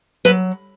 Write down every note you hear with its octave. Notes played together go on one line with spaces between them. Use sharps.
F#3 B4